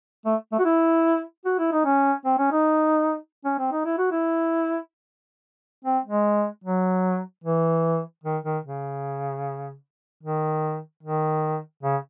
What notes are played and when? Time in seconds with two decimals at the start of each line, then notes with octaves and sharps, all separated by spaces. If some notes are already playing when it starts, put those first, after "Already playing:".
0.26 A3
0.52 A3
0.59 F#4
0.65 E4
1.45 F#4
1.59 E4
1.72 D#4
1.85 C#4
2.25 C4
2.38 C#4
2.52 D#4
3.45 C#4
3.59 C4
3.72 D#4
3.85 E4
3.98 F#4
4.11 E4
5.85 C4
6.04 G#3
6.64 F#3
7.44 E3
8.24 D#3
8.44 D#3
8.64 C#3
10.23 D#3
11.03 D#3
11.83 C#3